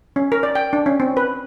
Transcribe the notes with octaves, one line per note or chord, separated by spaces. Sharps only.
C#4
A#4
D5
G5
D4
C#4
C4
B4